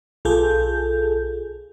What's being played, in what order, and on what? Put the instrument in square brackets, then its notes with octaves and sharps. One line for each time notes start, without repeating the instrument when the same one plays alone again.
[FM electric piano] B1 F4 G#4 A4 G6